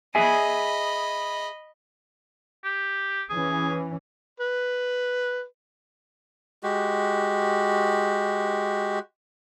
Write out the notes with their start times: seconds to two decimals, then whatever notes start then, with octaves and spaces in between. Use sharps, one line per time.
0.15 G#4 D#5 E5 G#5 B5
2.64 G4
3.30 E3 C#4 G#4
4.40 B4
6.63 G#3 F#4 G4